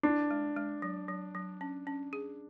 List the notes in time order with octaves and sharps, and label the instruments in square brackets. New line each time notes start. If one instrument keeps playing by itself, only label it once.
[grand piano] D4 [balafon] E4
[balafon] G#3
G#3
F#3
F#3
F#3
C#4
C#4
G#4